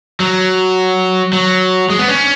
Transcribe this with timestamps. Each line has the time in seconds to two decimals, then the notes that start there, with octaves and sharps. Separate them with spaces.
0.20 F#3
1.33 F#3
1.90 G#3
1.99 B3
2.08 C#4